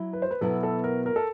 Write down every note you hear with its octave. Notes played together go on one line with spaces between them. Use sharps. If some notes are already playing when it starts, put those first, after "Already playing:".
Already playing: F#3 E4
B4
C5
B4
B2 F#3 B3 E4 A4
A4
A#4
A#4
A4